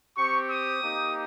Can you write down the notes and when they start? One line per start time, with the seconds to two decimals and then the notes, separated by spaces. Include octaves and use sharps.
0.16 C4 G4 C#6
0.49 D#6
0.82 A#3 D#4 G4